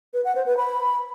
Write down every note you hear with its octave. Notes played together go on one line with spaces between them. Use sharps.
B4
F#5
C5
B4
B5